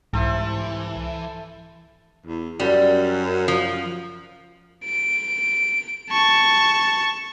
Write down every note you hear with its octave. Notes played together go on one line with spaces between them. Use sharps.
C2 G#2 E3 A4 C5 E5
E2
F#2 G3
F3
D7
A5 C#6